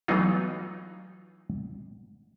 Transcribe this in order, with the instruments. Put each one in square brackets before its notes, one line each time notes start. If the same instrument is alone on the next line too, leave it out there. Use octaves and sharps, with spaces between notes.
[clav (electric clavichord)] E3 F#3 A3 B3 D#4 F4